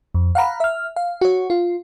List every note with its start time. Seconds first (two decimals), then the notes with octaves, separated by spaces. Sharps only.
0.14 F2
0.35 F5 F#5 A#5 B5
0.60 E5 F6
0.96 F5
1.21 F#4 C#5
1.50 F4